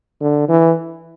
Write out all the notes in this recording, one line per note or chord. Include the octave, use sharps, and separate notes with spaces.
D3
E3